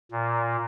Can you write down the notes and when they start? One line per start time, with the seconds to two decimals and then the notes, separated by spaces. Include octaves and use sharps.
0.11 A#2